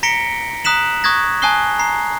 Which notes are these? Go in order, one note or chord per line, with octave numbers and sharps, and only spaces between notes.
A#5 A#6 B6 C#7 D7 G7
A#5 D#6 F#6 B6 E7 F#7
C#6 D#6 F#6 G#6 A#6
G#5 A5 D#6 F#6 C7 G7
A#5 C7